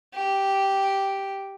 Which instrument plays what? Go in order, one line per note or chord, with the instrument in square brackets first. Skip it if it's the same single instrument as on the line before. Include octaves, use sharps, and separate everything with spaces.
[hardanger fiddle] G4